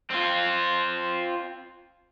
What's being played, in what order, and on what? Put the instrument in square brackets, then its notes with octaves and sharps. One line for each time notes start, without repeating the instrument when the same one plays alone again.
[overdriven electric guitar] C4 F4